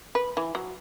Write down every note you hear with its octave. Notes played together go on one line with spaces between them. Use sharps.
B4
E3
F#3